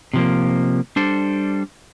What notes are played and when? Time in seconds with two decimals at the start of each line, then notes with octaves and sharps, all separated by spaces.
0.14 C3 F3 A#3
0.96 G3 D4 A4 C5